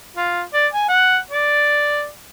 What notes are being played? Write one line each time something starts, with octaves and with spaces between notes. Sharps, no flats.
F4
D5
G#5
F#5
D5